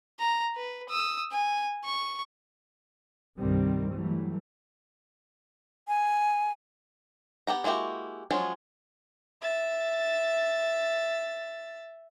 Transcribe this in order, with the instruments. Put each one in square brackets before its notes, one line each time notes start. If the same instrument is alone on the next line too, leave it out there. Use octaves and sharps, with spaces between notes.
[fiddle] A#5
B4
D#6 E6
G#5
C#6
[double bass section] C2 G2 C3 D#3 G3 C4
E3 F#3 G3 A3
[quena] G#5
[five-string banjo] B3 G4 F#5 A#5
G#3 A#3 E4 F#4 G4
F3 F#3 G#3 C#4 F4
[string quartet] E5 A6